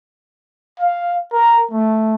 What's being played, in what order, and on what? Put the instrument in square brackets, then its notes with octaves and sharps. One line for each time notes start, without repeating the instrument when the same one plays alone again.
[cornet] F5
A#4
A3